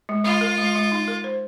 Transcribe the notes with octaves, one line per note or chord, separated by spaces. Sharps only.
G#3
G#3 F4
A#4
G#3
G#3
D#4
A#4
C5